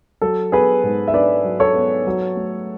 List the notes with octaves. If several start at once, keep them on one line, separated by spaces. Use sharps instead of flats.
F#3 A4
B3 G#4 B4
G#2
E5
D4 B4 D5
F#3
A4 C#5
B3
F#3
A3